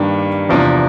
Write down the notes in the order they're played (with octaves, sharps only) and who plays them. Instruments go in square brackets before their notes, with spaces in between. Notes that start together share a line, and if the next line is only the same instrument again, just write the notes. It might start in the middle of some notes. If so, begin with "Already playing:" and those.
Already playing: [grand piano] G2 D#3 G3 A#3 D4
E2 C3 F3 A#3 D4